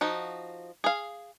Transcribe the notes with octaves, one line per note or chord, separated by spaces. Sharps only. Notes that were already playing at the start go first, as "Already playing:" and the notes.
F3 D#4 F#4
G#4 F5